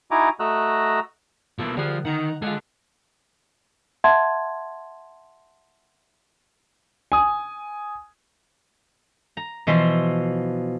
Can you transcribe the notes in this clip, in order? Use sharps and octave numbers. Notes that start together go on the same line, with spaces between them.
D#4 E4 F#4 G#5 A#5 D6
A3 F#4 D#5 A#5 E6 F#6
B2 F3 A#3 E4 A4
D3 F3 G3 G#4 F#6
D#3 D#4 F#5 A#5 C#6
G#3 F4 G#4 A4 F#5
E5 F#5 A5 C6 G#6
G#5 D#6
A#5
B2 E3 F3 E5 C6